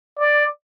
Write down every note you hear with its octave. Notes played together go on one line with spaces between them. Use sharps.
D5